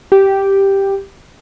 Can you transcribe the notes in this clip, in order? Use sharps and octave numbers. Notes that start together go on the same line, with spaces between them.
G4